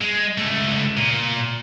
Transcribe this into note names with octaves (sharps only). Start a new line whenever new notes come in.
G#3
C#2 A3
A#2